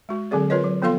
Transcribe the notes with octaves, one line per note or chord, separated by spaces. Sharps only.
G#3 F#4
D3 F#3 C4 G#4 D5
F4 A#4 B4 C#5 D#5
F#3
F3 B3 F4 A4 F5 C6